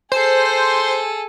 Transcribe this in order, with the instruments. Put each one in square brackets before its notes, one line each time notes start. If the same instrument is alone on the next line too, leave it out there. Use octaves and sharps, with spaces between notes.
[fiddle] G#4 A4 [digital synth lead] C5